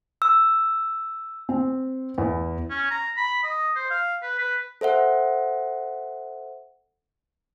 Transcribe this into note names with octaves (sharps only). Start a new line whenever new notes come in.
E6
C4
E2
C#4
A#5
B5
D#5
C5
F5
B4
B4
A4 C5 E5 F#5